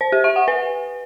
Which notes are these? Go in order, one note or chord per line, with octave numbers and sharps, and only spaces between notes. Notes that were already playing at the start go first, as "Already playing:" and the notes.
C5
G4
E5
F#5
B4